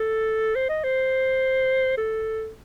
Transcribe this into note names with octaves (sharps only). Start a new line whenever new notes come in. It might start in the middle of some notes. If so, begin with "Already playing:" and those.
Already playing: A4
C5
D#5
C5
A4